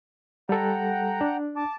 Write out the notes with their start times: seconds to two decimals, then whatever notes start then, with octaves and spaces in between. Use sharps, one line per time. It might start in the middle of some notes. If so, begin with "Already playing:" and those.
0.49 G3 A4 F#5 G5 A#5
1.21 D4
1.56 A5 D6